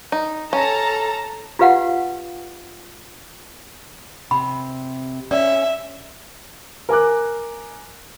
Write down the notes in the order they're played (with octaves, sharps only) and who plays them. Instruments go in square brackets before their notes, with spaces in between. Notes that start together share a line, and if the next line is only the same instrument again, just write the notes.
[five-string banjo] D#4
[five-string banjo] C#4 [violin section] A4 A5 A#5
[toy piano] F4 G4 B4 F5 F#5
[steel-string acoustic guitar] C3 [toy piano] B5
[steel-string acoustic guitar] C#4 [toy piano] D5 [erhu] E5
[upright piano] A#4 G#5 D6 F#6